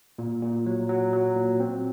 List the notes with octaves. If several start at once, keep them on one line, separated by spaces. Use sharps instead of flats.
A#2
A#2
F#3
F#3
F#3
A#2
C4